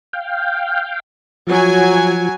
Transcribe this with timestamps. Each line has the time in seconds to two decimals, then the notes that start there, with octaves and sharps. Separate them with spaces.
0.13 F5 G5
1.47 F3 F#3 G#5